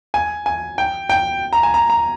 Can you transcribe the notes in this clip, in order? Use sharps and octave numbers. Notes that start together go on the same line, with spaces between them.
G#5
G#5
G5
G5
A#5
G#5
A#5
A#5